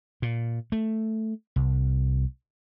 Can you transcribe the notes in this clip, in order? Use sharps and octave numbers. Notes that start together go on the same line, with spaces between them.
A#2
A3
C2